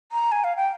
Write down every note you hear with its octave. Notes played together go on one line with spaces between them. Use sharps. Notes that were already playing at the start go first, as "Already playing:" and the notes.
A#5
G#5
F5
G5